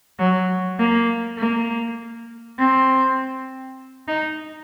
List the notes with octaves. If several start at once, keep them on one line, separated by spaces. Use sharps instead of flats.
F#3
A#3
A#3
C4
D#4